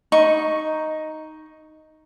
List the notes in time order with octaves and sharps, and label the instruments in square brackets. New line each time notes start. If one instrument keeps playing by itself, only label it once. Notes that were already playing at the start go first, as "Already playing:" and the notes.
[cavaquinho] D#4 C#6